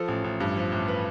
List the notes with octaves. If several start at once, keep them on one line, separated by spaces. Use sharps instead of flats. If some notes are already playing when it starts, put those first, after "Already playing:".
Already playing: F3 A4
A1
A1
G2
F3
A1
B4